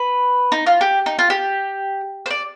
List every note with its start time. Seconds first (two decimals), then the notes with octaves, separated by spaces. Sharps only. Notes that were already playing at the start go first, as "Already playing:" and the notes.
Already playing: B4
0.52 D#4
0.66 F4
0.81 G4
1.06 D#4
1.19 F4
1.30 G4
2.26 C5
2.30 D5